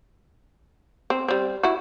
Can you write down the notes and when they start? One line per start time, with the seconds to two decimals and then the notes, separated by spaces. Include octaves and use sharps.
1.10 C4
1.28 G3 C4
1.63 E4 F#4